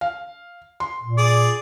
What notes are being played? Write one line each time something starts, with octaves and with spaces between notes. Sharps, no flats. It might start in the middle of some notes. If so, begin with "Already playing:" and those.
F5
C6
A#2
G#4 D5